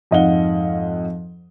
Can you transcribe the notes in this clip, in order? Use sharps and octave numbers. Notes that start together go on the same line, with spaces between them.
F2 G#2 D#5 F5 F#5 G7